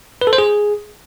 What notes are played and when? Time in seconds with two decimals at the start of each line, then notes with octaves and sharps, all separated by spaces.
0.21 B4
0.27 A4
0.33 C5
0.38 G#4